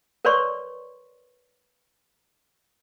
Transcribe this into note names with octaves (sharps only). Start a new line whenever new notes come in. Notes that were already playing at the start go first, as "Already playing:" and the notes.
A#4 B4 C#5 D5 C6 C#6